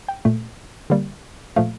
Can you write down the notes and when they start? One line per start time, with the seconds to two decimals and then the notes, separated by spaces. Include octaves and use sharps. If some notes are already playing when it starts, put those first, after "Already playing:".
0.08 G5
0.25 A#2 A3
0.90 D3 G3 A#3
1.56 A#2 F3 A3 F5